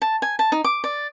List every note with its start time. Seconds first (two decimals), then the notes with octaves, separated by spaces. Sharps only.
0.02 A5
0.22 G#5
0.39 A5
0.52 D#4
0.64 D6
0.84 D5